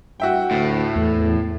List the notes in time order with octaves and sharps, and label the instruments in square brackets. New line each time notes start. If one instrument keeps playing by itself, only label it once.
[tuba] G2 [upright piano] F#4 E5 G5
[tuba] D2 [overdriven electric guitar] A2
[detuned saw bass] E2 [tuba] A3